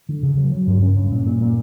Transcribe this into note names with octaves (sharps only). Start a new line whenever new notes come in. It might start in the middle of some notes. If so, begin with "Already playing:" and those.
D3
C#3
F#3
F#3
G2
C#4
G2
A#2
A#2
A#2